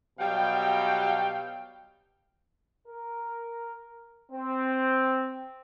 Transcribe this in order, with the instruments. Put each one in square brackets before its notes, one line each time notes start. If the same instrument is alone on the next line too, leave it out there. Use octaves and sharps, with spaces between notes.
[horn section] B2 F#3 G3 F5 G5
[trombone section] A#4
C4